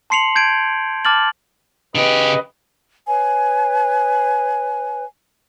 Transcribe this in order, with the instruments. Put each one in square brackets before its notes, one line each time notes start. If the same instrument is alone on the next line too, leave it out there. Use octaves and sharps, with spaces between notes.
[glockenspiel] A5 C6 C7 C#7 F7 F#7
A5 G6 G#6 C7 D7
A5 D6 F6 A6 F#7
[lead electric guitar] C#3 G4 [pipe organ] B4 D#5
[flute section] B4 C#5 G#5